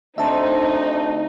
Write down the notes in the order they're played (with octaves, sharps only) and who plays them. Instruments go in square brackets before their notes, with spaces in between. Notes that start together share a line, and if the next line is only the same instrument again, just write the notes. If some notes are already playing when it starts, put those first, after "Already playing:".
[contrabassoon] D2 [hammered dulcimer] C3 C4 F4 [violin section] D#4 [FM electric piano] E5 A5